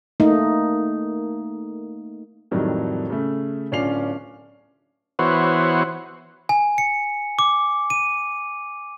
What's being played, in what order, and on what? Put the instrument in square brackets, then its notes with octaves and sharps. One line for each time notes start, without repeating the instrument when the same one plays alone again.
[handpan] A3 A#3 D#4
[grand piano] F2 A2 D#3 F#3 G3
C#3 A3
D1 C#4 D4 F4 C7 F7
[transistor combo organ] E3 B3 F#4 C5 C#5
[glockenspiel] G#5
C#7
D6
D#7